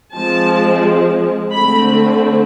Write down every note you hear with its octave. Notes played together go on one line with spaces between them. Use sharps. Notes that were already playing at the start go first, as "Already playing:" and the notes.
F3 G#3 C4 A5
D3 A3 C4 B5